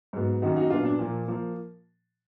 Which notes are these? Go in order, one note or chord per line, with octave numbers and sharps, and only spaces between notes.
G#2 F#3 B3
F#2 D#3 A#3 D#4 F#4
D#4 F#4
A#2 F#3 B3 D4 F4
D4
A#2 F3 A#3
F3 A#3